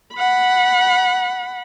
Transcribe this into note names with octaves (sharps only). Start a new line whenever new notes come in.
F#5 B5